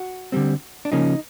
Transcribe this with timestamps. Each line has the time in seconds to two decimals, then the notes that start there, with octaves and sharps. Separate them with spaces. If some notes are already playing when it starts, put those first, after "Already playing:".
Already playing: F#4
0.32 D3 G3 C4
0.85 D4
0.92 C#3 F3 A#3 C#4 D#4